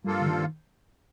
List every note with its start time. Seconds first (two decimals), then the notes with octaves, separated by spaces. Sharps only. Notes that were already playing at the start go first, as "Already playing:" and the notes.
0.04 G2 F3 G3 A#3 F4 A4
0.21 D3
0.26 D#3
0.39 D#3